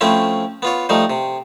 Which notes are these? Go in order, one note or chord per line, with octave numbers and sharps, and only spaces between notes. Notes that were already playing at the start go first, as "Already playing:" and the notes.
F3 A3 C4 C#4 E4
B3 F4 C#5
F3 G3 A3 D#4
C3